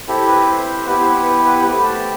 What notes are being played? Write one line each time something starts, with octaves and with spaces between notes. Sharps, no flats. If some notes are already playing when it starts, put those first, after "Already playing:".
C4 E4 G4 A4
B4
C5
B3 E4 G4 B4
C5
B4
B4
B4
A3 C4 G4 B4
A5